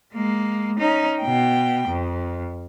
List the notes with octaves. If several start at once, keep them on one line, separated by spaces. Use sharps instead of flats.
G#3 A#3
C#4 D#4
B2 G5
F2